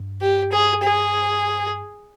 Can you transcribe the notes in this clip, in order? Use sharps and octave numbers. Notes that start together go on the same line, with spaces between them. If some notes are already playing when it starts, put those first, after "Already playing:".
Already playing: G2
G4
G#4
G#4